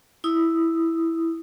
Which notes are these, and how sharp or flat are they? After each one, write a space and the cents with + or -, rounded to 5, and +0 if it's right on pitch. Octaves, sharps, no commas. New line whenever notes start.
E4 +0 D#6 +0